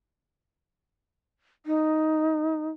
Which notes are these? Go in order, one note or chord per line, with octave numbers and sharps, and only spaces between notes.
D#4